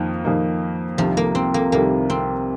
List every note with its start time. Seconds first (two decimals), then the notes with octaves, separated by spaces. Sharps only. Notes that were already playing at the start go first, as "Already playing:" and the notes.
Already playing: F2 D#3 F3 A#3 D#4
0.24 F2 D#3 A#3 D#4
0.98 C2 C3 D#3 F3 G3
1.17 A#3
1.35 C4
1.54 A#3
1.72 C2 C3 D#3 G3 A#3
2.10 C4